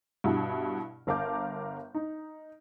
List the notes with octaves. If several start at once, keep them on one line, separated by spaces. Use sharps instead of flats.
G2 B2 E4 F#4
G1 A#4 F5 A5 D6 G6
D#4